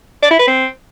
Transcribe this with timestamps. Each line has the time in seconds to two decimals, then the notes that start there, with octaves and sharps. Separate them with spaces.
0.22 D5
0.31 E4
0.39 B4
0.47 C4